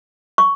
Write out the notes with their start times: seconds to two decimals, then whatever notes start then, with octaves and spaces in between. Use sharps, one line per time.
0.38 C#6